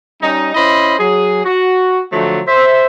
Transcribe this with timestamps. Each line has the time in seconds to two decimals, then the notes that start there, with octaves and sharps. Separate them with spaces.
0.22 G3 C#4 D#4
0.55 C#4 E4 C5 D#5 B5
0.99 F#3 G#4
1.45 F#4
2.12 D3 F3 F#3 A3
2.48 C5 E5